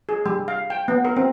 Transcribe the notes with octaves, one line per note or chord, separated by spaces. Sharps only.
G#4
G3
F5
G5
B3
A#4
C4